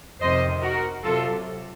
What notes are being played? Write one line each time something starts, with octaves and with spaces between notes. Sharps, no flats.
F2 C3 D#3 C5 D#5
F#4 A#4
C3 F#3 F4 A4